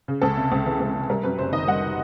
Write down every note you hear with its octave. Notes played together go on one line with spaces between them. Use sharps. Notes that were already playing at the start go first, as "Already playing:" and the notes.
C#3
C#2 A4
C3
C#2
E3
C#2
C3
G3 A#4
F#2 B4
F#1 C5
D#3 D#5
G3 F#5